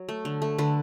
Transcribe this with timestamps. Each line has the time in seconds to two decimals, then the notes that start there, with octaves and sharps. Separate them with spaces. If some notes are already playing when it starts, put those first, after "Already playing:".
Already playing: F#3
0.09 A3
0.25 D3
0.42 A3
0.58 D3 B4